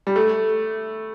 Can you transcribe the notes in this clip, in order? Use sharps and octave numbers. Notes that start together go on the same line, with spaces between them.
G3
A3